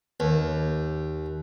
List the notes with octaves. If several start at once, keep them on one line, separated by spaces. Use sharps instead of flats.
D#2